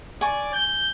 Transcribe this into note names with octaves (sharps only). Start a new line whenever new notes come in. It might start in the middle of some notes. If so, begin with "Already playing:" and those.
D5 G#5 C#6
G6